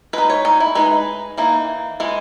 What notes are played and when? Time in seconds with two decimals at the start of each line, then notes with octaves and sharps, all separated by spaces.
0.13 G#3 D#4 B4
0.30 C#5
0.45 D#4
0.60 E4
0.75 G#3 D#4 B4
1.38 E3 A#3 D#4
2.00 E3 G#3